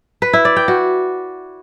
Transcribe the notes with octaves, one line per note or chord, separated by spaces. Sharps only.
B4
E4
D5
G5
F#4